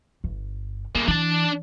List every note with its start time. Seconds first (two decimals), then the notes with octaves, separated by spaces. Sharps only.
0.24 G1
0.95 E2 D3 A#3
1.08 E3 D4 A5